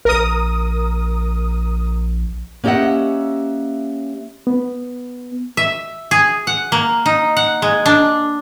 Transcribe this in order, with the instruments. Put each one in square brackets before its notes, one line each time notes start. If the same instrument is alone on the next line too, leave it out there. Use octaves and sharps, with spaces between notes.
[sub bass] A#1 [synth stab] A#4 D#6
[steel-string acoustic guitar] A#3 C#4 G4 D#5 E5 F#5
[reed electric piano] B3
[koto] E5
G#4
F#5
A#3
D#4
F#5
G#3
D4